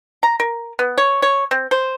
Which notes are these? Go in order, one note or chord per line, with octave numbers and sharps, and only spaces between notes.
A#5
A#4
B3
C#5
C#5
C4
C5